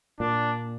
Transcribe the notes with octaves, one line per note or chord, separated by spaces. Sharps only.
A#2 D4